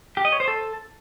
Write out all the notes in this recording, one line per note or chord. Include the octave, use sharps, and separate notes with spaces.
G4
D#5
C#5
C5
A4